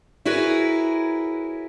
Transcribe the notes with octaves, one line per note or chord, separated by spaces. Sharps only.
E4 F#4 G#4 A#4 B4 C#5